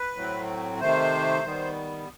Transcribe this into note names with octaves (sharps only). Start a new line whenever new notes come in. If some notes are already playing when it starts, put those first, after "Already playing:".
Already playing: B4
A2 F#3 C4
C3 D#3 A3 C5
D#3 G3 B3